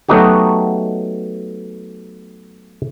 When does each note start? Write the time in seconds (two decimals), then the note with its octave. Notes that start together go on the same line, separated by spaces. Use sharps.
0.09 F#3 A3 B3 D#4 F#4 G4